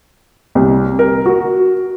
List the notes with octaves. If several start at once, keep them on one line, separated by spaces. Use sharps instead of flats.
C2
A#4
F#4